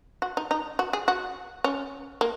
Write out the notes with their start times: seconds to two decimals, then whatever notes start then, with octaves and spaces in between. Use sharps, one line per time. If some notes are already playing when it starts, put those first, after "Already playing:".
0.22 F#4
0.37 D#4
0.51 D#4
0.79 F#4
0.93 G#4
1.08 F#4
1.64 C#4
2.21 A#3